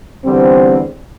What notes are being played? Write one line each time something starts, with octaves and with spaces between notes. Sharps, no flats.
E2 D3 G3 C4